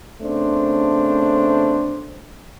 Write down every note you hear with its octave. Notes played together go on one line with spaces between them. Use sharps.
C#3 A3 B3 C4 D4 C5